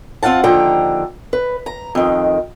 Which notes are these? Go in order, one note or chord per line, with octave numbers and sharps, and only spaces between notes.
C4 F4 F5 F#5 A5
D#2 D3 F3 G5 A#5
B4
A#5
F2 D#3